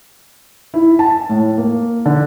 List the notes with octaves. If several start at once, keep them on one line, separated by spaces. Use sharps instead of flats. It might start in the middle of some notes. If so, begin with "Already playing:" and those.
E4
A5
A2
A#3
D3